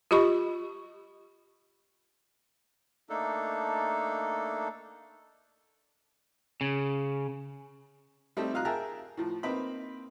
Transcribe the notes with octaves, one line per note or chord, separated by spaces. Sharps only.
F4 G4 D#5 B5 C#6
A3 A#3 D4 D#4 A4
C#3
G3 A3 C4 D#4 A4
A#2 D#4 F5 A#5 F#6
G#4 A#4 E5 G5 A5 A#5
A2 F3
A#3 C4 D#4 B4 B5